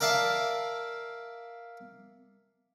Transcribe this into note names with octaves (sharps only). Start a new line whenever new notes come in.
A#4 D5 E5 F5 A5